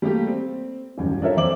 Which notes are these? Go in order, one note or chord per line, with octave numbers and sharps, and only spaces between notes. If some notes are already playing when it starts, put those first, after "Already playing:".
G3 A3 A#3 G4
C4
D#1 A1 F#2
D4 F4 A4 A#4 C#5 E5
F2 C5 E5 D6 F#7